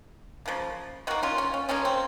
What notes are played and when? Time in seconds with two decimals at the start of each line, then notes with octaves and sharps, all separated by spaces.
0.46 C#3 F3 A#3
1.07 D#3 A#3 D#4 F#4
1.23 C#4 F4
1.38 C#4
1.54 C#4
1.69 C#3 F3 A#3 C#4
1.85 C4